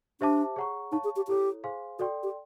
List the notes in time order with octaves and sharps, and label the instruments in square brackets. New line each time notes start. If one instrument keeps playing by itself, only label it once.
[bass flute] D4 [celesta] G4 C5 E5 A5 D6
[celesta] G#4 C#5 F#5 A#5 C#6
[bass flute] D#4 [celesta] C#5 F5 A5 C#6
[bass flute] G#4
G4
[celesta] E4 A4 C#5 [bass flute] G4
[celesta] G#4 C5 F5 G#5 C6
[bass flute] F#4 [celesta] A4 D5 G5 C6
[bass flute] G4